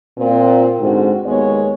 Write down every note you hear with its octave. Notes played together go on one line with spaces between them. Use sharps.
A#2 C4
G#2 D3 C4 F#4
D#2 G#3 B3 C#5